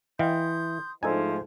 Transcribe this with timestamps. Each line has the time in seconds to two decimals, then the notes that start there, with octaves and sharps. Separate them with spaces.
0.19 E3 D#5 F5 G5 C6 D#6 G6
1.03 G#2 F3 A3 D4 D#4 A4 C5 G#5